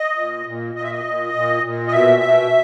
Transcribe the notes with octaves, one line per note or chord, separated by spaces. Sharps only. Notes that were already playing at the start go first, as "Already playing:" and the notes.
Already playing: D#5
A#2
A#2
A#2 D#5
E5
D#5
A#2
A#2
A#2
D#5
B2 E5
B2